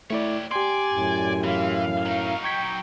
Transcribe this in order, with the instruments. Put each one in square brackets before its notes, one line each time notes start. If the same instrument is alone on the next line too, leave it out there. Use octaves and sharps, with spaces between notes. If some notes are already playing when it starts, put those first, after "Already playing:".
[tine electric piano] A3 E4 D5 [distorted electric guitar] G4 C#5
[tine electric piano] G4 C6 [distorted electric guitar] D5 [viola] G#5
[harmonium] F#2 A2
[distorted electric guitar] E3 [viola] F5
[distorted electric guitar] F#3 D#4
[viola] G5 [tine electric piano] C#6 G#6 B6